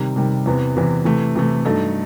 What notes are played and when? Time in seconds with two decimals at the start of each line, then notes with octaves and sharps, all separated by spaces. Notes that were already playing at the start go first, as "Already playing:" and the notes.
Already playing: C3 D#3 G3
0.16 C3 D#3 G3
0.46 E2 C3 E3 B3
0.76 E2 C3 E3 B3
1.05 C3 E3 A3
1.36 C3 E3 A3
1.65 G2 F#3 A3 D#4 A4